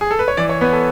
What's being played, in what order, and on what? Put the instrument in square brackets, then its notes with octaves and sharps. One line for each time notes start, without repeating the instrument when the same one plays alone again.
[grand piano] G#4
A4
B4
C#5
E3 D5
C#5
B3 B4
A4